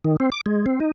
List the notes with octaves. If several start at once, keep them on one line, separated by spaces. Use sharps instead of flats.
D#3
C4
D6
G#3
C4
D#4